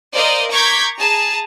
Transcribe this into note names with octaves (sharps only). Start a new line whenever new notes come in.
A#4 C5 D5 D#5 F5
A#5 C#6 D6 G6 G#6 B6
G#4 A5 A#5